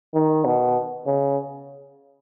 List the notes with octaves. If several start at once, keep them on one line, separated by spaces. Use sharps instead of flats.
D#3
B2
C#3